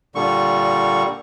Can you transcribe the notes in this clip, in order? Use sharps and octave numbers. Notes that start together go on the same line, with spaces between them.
A#2 D3 G3 C#6